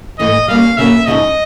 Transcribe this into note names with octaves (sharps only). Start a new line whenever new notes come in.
G#2 E3 A3 D#5
G3 A#3 C#4 F5
C#3 F#3 A#3 C#4 E5
C#3 F3 G#3 C4 D#4 D#5